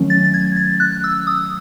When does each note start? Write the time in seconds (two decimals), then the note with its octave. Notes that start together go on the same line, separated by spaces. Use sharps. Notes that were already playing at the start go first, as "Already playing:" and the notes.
Already playing: D#3 F#3 A3 C#4
0.10 A6
0.24 A6
0.34 G#6
0.56 A6
0.80 F#6
1.04 E6
1.27 D#6